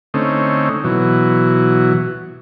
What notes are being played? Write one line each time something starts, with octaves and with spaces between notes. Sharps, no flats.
D3 A3 C4 C#4 D#4
B2 E3 F#3